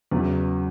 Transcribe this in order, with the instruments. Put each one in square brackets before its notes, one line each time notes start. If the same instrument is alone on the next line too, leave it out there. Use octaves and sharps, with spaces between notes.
[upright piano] E2 C#3 E3 [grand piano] F#3